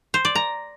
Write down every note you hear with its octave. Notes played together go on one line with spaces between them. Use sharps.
C5
D5
A#5